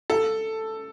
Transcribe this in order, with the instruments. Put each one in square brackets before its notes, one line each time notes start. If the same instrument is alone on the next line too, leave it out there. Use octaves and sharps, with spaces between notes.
[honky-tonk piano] A4